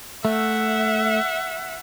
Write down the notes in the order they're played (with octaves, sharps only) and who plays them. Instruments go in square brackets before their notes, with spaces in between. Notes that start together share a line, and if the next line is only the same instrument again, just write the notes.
[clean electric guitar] A3 [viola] E5 F#5